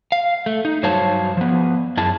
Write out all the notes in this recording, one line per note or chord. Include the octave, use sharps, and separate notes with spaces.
F5
A3
D#4
G2 F#3 C5 C#5 F5 A5
F3 B3
F#2 E4 G#4 A5